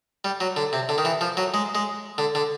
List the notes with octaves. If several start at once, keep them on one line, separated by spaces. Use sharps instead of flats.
G3
F#3
D3
C3
D3
D#3
E3
F3
F#3
G#3
G#3
D3
D3